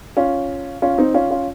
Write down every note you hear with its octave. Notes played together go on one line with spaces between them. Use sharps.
C#4 F4
C#4 F4
C4 D#4
C#4 F4
C#4 F4